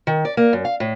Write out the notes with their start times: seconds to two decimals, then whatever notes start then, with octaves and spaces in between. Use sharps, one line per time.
0.07 D#3
0.25 D5
0.37 A#3
0.53 F#2
0.65 F5
0.80 A2